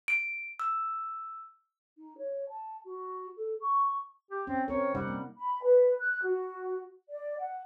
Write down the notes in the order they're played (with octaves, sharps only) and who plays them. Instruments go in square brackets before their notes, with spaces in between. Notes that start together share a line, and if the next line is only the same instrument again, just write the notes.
[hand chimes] D7
E6
[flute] D#4
C#5
A5
F#4
A4
C#6
[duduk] G4
[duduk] C4 [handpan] C#4
[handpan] C4 A#4 [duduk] C#5
[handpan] C3 D#4 F#5 [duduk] G3
[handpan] A#3
[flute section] B5
B4
F#6
F#4
D5
F#5